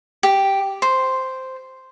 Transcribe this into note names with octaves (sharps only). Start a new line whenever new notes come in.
G4
C5